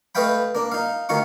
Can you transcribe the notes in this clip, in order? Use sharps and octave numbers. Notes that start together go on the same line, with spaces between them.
A3 B4 D#5 F5 G5 B5
A#3 D4
D#4 F5
D2 D#3 D#4 F5 C#6